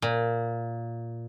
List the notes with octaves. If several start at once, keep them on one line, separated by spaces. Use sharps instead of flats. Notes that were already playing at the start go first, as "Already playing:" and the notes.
A#2